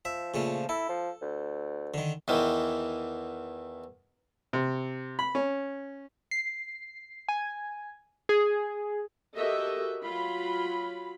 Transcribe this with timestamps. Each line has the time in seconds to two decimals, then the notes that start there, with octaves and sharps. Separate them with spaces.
0.05 F3 E5
0.34 A#2 C#3 A3
0.69 E4 A4
0.89 F3
1.22 D2
1.94 D3 D#3
2.28 E2 D#3 E3
4.53 C3
5.19 B5
5.35 C#4
6.31 C7
7.29 G#5
8.29 G#4
9.36 F#4 G4 A4 A#4 D#5 E5
10.04 F#3 F4 B5